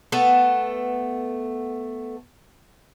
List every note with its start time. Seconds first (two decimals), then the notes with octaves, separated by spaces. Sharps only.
0.12 A3 B3 A4